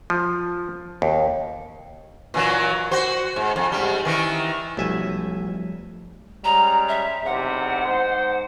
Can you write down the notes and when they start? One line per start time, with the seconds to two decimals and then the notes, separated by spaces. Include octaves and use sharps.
0.10 F3
1.02 D#2
2.34 A#2 E3 F#3
2.91 F#4 C5
3.36 G#2
3.56 F2
3.72 G#2 G3
4.05 D#3 E3 E4
4.77 B1 F3 G3 A3 E5 G#5
6.44 G3 G#3 C#4 A#5
6.88 E5
7.25 B1 E2 C3 F#5
7.86 G#2 C5